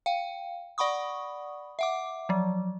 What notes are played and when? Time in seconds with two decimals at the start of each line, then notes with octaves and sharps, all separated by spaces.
0.06 F5 G5
0.78 D5 F#5 B5 C#6 D#6
1.79 E5 F#5 D6
2.29 F3 F#3